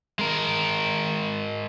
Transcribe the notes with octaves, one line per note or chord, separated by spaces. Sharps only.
G#3 A#4